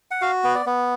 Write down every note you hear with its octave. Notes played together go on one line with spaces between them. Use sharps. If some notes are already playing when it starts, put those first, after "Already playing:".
F#5
F#4 F5
B3
D5
B3